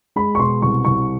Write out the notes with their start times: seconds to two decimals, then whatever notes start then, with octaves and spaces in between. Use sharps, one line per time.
0.16 G#3 B5
0.35 C#6
0.39 B2 C6
0.62 C2 C#6
0.85 C2 C#6